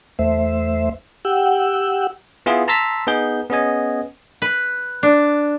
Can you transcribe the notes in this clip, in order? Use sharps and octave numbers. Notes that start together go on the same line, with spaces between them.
E2 A3 C5 E5
G4 F#5 G5 E6
B3 E4 F4 G#4
A5 A#5 C6 E6 A6 B6
B3 D#4 G#4 G6
B3 C#4 G#4 D#5 G#5
B4
D4